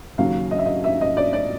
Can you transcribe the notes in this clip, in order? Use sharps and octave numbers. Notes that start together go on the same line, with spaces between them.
D#2 C#3 F#3 F5
D#5
E5
D#5
E5
D#5
D5
D5